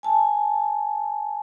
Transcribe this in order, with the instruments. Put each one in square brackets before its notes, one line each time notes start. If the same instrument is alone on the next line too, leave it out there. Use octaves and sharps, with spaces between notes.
[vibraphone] G#5 A5